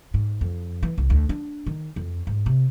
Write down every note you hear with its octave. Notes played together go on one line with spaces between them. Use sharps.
G#2
F2
E3
C2
D2
D4
D#3
F2
G#2
C3